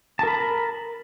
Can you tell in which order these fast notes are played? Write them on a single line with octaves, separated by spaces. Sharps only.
A5 A#4 B5